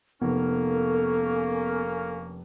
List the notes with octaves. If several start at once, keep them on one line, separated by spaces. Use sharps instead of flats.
F1 A#3 B3 C#4 A4